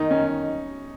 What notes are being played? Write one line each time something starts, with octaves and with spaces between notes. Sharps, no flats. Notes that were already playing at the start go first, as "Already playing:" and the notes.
Already playing: D#3 D#4
C#4